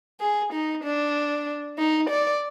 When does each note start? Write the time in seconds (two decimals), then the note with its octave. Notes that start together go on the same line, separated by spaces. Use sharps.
0.20 G#4
0.53 D#4
0.84 D4
1.79 D#4
2.10 D5